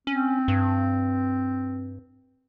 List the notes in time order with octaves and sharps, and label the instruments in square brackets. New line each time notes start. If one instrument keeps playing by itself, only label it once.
[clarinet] C4 [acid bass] C#4
[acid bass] G2